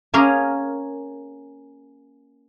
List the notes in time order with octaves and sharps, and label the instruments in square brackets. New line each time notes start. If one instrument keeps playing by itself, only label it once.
[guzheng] A#3 C#4 G#4 A#4